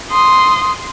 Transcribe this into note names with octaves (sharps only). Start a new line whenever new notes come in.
C6 D#6